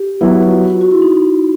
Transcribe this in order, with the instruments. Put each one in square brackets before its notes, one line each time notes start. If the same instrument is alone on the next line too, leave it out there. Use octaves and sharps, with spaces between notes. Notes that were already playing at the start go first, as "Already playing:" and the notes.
Already playing: [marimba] G4
[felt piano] F#3 B3 E4
[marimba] F#4
F4
F#4
E4
D#4